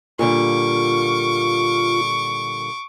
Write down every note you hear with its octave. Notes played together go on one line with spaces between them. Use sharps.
A#2 D3 G3 F4 C#6 D6